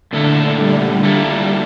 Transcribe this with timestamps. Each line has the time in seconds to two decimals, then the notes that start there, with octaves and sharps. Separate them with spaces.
0.13 A#2 D3 A3 E4 A4
0.58 G3
1.03 F3 G3 A#3 E4 A4